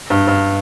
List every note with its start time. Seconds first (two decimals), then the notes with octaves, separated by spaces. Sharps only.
0.10 G2
0.27 G2